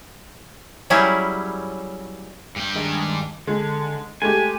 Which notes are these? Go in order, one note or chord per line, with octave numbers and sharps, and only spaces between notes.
F#3 G3 C#4 E4 G#4
G2 G5
D#3 G#3 D4
D3 G#3
G#3 A3 G4 G#5